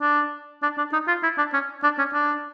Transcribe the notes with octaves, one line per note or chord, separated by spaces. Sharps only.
D4
D4
D4
D#4
F4
E4
D4
C#4
D4
C#4
D4